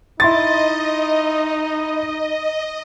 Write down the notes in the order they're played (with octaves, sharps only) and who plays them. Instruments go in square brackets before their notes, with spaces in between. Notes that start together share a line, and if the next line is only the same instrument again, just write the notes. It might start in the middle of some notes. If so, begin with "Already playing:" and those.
[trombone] D#4 [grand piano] E4 C6 A6 [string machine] D#5